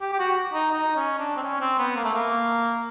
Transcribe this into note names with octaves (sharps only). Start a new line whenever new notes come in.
G4
G4
F#4
D#4
D#4
C#4
D4
C4
C#4
C4
B3
A#3
A3
A#3